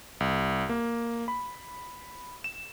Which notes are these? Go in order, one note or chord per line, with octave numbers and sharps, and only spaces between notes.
C2
A#3
B5
E7